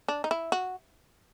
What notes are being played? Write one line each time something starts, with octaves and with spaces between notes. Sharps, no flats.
D4
D#4
E4
F#4